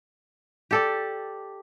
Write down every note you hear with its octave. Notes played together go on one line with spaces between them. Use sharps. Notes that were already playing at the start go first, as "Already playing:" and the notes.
G4 A4 D5